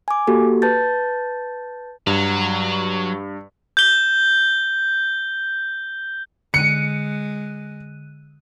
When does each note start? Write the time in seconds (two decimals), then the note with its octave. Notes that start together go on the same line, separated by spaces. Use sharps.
0.08 G#5 D6
0.27 A#3 F#4 G4 A4
0.62 B4 A5 G6 A6
2.07 G2 F#3
3.77 G6 G7
6.54 D3 G#3 F#6 C#7 D#7